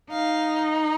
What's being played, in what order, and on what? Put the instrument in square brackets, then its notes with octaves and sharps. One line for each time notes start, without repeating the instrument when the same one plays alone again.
[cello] D#4 [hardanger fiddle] F5